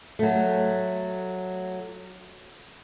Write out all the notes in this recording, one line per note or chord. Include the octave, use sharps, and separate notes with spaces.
F#3 A3